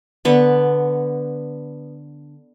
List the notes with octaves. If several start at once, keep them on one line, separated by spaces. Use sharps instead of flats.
D3 B3